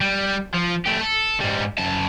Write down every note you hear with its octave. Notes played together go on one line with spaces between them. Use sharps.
G3
F3
A3 G4
A4
G#2 G3
F#2 A5